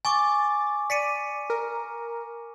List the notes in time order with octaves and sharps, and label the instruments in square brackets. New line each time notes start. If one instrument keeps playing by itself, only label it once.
[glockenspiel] G#5 C#6 D6 [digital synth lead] A6
[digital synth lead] D5 [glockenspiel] B6 C#7 D#7
[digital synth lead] A#4